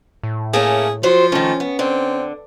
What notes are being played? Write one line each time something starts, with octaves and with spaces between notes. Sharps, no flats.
A2
A3 A#3 C#4 G#4
F3 F#3 C5
D#3 A3 C#4
B3
D3 C4